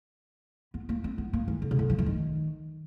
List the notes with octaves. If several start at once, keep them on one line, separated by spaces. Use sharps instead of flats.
B3
A#3
C4
B3
A#3
E3
D3
C#3
D3
F3
E3
D#3